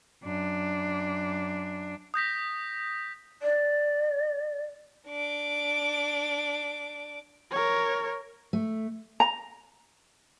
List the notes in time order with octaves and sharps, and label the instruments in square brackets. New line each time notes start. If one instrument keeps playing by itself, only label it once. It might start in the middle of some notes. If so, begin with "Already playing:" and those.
[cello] F#2 D4
[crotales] D#6 G6 A#6 B6
[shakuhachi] D5
[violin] D4 D6
[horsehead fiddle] A#4 C#5
[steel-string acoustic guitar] A3
[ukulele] A#5